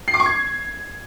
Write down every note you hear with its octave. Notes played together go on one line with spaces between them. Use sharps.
C7
D6
C#6
G#6